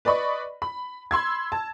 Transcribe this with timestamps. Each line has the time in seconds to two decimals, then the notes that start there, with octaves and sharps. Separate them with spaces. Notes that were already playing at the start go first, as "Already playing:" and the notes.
0.05 B4 D5 D#5 B5 C#6
0.62 B5
1.11 B5 C6 E6 G#6
1.52 A5